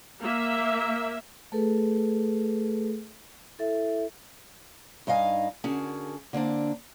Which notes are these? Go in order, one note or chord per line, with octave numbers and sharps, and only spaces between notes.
A#3 E5
A3 G#4 A4 B4
E4 A4 E5
G2 D#4 D#5 F5 G#5
D3 C#4 F#4 G#4 A#4 A5
D3 A#3 C4 D4